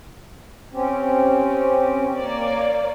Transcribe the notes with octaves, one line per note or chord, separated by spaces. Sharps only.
C4 C#4 G4
A#3 C#5 D5